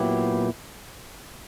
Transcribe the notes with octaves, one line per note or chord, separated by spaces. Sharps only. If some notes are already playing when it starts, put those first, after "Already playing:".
Already playing: A#2 F#3 B3 E4 G4